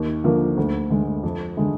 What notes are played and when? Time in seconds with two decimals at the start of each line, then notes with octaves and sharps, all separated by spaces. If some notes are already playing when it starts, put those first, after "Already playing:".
Already playing: D#2
0.24 D3 F3 A#3
0.57 D2
0.90 D3 G#3
1.23 F2
1.57 D3 G#3